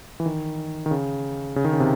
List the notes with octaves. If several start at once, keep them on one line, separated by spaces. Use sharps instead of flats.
E3
D#3
D#3
C#3
C#3
D#3
C#3
C3